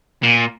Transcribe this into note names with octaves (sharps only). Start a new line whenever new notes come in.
A#2